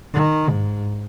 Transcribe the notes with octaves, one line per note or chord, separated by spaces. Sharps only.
D#3
G#2